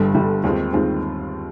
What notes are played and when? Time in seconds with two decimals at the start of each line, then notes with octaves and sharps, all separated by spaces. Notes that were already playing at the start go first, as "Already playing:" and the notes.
Already playing: G1 G2 D3 G3
0.14 G1 G2 D3 G3
0.44 D#2 D#3 G#3 C4 F4
0.73 D#2 D#3 G#3 C4 F4